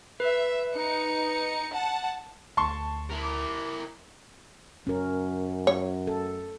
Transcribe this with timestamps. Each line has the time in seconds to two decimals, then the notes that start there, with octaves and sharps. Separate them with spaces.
0.20 B4 E5
0.73 D#4 C#7
1.73 F#5 A5
2.57 D2 A5 C6 C#6
3.10 E4 A#4
3.22 D6
4.87 F#2 C#4 A#4
5.67 C#5
6.07 A4